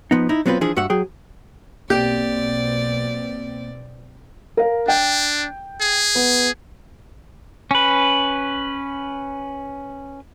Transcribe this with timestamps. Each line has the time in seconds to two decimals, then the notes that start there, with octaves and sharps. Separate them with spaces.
0.11 F3 B3 D#4
0.29 D#4 E4
0.46 F#3 B3 C4 F4 B4
0.61 E3 F3 D4 G#4
0.76 G2 F#4 E5 F#5
0.90 F#3 G#4 G5
1.90 B1 B2 A#3 C4 G4 D5
4.57 A#4 F5
4.88 D4 G5
5.81 G#4
6.15 B3
7.71 C#4 B4